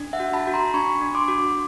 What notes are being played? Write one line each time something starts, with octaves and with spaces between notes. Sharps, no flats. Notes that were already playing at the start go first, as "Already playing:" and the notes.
Already playing: D4
E5 F#5
F#4
A5 B5
F#4
A#5 C6
D4 B5 C#6
D4
C6 D6
F#4